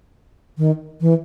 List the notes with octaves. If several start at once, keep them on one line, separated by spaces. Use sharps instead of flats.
D#3
E3